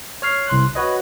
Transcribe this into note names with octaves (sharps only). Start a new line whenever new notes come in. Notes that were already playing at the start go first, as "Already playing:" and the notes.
C#5 F6 C7
C2 C6 F#6
F#4 B4 C#5 D#5